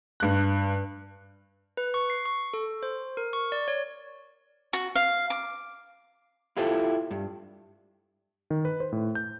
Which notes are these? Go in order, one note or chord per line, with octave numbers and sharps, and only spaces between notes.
G2 F#6
B4
C#6
C7
C#6
A4
C5
A#4
C#6
D5
C#5
F#4
F5
D6
E4 F4 G4 A4 C5
G2
D#3
B4
C5
A2
G6